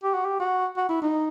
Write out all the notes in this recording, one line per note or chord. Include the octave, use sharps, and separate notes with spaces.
G4
F#4
G4
F#4
F#4
E4
D#4